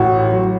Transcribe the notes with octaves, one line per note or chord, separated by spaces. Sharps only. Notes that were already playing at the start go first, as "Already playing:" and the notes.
Already playing: A1 A2 F#4
F#3